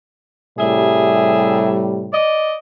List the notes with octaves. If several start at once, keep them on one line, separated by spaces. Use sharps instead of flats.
A2 C3 G3 G#4 E5
D5 D#5